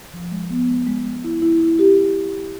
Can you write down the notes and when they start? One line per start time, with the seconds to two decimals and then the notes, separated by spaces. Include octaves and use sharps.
0.14 F3
0.32 G#3
0.50 B3
0.68 G#3
0.87 G#3
1.05 G#3
1.24 E4
1.42 E4
1.60 E4
1.79 G4